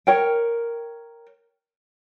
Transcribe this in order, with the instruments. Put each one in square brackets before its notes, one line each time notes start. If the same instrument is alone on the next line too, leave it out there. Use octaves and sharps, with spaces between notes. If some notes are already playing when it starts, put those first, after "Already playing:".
[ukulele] A#4 C#5 G5